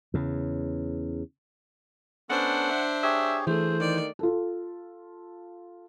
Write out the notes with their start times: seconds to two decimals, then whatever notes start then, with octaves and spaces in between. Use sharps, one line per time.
0.14 E2 C#3
2.30 B3 C#4 D4 A4 C5 F#5
2.70 E5
3.03 G4 G#4 C#5 E5
3.47 E3 A3 G#4 C5
3.80 D#3 D5
4.19 F4 A4